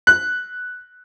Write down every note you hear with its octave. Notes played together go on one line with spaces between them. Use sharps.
F#6